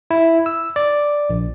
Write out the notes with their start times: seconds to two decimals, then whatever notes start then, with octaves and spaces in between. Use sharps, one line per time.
0.11 E4
0.46 E6
0.76 D5
1.30 A#1